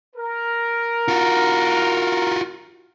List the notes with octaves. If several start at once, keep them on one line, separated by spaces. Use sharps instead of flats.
A#4
F4 F#4